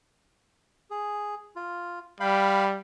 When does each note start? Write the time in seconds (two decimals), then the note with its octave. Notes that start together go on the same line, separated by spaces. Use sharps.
0.91 G#4
1.56 F4
2.20 G3 F5 G5 B5